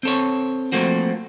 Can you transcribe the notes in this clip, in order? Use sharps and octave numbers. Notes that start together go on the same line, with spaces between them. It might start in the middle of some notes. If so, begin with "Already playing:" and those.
C4 A4 C#5
F3 A3 A#3 C4 F#4